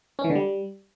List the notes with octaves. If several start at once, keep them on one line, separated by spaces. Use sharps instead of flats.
C#4
E3
D3
G3